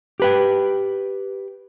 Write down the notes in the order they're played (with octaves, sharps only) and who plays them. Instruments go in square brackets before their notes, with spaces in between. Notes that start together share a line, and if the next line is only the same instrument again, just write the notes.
[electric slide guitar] G4 B4 G5